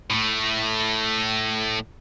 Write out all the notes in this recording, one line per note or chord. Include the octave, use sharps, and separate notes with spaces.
A2 A3